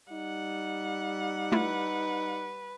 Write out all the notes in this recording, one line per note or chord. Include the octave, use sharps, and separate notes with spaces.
G3 D#4 F#5
A3 E4 F4 B4